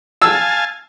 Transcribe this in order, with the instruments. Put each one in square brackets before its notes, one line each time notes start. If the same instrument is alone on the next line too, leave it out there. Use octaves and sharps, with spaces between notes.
[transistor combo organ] F5 G#5 A5 [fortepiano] E6